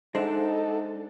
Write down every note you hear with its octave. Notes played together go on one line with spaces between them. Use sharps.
G#3 D4 D#4 A4 C5 E5 F#5